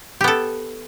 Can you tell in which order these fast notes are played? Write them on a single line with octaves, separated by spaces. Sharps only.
G4 B3 A4